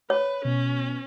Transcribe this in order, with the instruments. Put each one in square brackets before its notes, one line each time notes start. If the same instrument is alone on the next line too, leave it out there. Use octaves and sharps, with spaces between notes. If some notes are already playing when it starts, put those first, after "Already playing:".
[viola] B4 [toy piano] C#5
[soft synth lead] B2 [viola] C#4